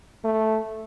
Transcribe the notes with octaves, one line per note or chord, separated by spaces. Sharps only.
A3